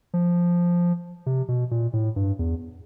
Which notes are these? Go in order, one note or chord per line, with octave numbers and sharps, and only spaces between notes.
F3
C3
B2
A#2
A2
G2
E2